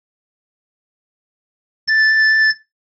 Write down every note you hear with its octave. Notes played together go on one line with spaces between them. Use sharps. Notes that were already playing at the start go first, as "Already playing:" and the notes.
A6